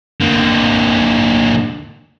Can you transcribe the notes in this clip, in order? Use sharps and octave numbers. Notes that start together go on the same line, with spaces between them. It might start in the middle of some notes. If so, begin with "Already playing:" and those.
D3 A#3